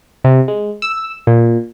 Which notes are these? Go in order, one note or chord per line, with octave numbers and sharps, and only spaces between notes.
C3
G#3
E6
A#2